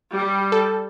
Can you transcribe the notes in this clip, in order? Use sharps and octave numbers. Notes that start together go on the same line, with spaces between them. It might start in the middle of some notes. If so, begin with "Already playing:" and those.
G3
A4